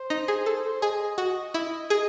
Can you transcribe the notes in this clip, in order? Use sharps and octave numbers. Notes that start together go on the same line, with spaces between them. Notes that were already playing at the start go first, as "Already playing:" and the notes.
Already playing: C5
D#4
G#4
A4
G#4 D#5
F#4
E4
G#4